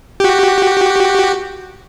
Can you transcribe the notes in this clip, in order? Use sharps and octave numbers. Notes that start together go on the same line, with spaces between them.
F#4 G4